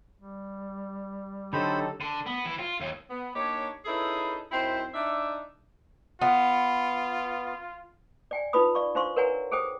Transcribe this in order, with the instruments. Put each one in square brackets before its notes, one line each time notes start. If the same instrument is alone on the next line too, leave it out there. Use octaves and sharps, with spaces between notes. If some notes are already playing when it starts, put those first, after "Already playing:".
[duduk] G3
[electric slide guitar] D3 [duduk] F#3 [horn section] D#4 G4 A4 [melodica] C5 B5
[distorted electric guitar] D3
B3
E3
F4
D#2
[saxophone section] B3
A#3 D4 D#4 G4 C#5
C#4 D#4 E4 G#4 A4 B4
F#2 C4 D#4 E4 C5
D4 D#4 D5 E5
[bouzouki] B3 [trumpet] F4
[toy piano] D5 G5 G#5
D#4 F4 B4 B5 D#6
D5 F5 C#6
D4 C5 F5 C6 C#6
A#4 B4 C#5 F#5 G#5 A#5
G#4 A4 C5 G5 D#6